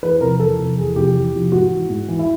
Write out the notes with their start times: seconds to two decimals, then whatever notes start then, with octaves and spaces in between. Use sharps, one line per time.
0.03 E2 B4
0.21 C3 F3 A#4
0.39 E2 A4
0.59 C3 F3
0.78 E2 G#4
0.96 C3 F3 G4
1.15 E2
1.34 C3 F3
1.52 G#2 F#4
1.71 E3
1.89 G#2
2.08 E3
2.19 E4